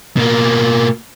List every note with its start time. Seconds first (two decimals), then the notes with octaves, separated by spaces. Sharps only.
0.17 B2 A#3